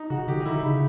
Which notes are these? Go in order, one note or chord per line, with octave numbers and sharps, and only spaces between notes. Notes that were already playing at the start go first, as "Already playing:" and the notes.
Already playing: D#4
C#3 F#4
D3 G4
D#4
D3 E4
C#3 D#4